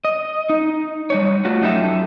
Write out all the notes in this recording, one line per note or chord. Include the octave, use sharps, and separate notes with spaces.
D#5
D#4
G3 D#4 C#5
A3 F4 F#4
F#2 D#4 G4 A4 E5